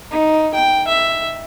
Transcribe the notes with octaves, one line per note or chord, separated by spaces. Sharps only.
D#4
G5
E5